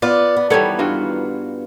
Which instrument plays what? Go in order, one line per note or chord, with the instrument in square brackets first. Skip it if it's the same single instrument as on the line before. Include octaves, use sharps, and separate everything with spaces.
[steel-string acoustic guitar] B3 D5 [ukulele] F4
[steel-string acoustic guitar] B3
[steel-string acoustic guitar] D#3 E3 [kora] G3 B3 [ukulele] A4 C#5
[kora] G2 F4 F#4